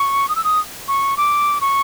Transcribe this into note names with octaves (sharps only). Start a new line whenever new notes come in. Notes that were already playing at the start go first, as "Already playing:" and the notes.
Already playing: C#6
D#6
E6
D#6
C#6
D6
C#6